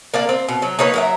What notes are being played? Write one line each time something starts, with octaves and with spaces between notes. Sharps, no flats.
A#3 D5 F5
C4
B2
F#3
A#3 D#4 B4 C#5
F#3 A#4 E5